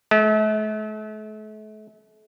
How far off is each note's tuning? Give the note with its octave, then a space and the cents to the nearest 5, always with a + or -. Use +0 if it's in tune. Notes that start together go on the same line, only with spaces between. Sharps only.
A3 -40